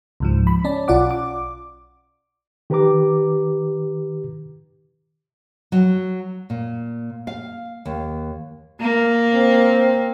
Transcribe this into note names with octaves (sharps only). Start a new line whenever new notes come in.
C#2 G#2 F3
B5
C#4 D5 A5
B1 F4 D5 F#5 D6
D6
D#3 G4 B4 A#5 D6
F#3
A#2
F5
D#2
A#3
C4